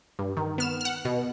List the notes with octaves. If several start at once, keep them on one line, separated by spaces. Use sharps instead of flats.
G2
D#3
B3 F6 E7
F#5 F6
B2